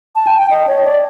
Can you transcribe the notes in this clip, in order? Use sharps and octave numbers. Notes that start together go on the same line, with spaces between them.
A5
G5
G5
D#5
C#5
D5